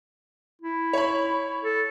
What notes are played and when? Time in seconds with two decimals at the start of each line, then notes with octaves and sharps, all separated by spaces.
0.62 E4
0.93 C#5 B5
1.63 A4